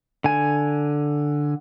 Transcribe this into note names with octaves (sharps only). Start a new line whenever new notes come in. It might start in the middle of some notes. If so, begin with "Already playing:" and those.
D3 G#5